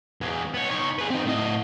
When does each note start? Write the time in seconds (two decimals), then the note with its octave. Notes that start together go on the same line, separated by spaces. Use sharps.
0.21 E2 G#3
0.54 B3 C#5
0.71 D#4 C#5
0.99 G#4 B4
1.10 C4 D#4
1.26 A2 D#5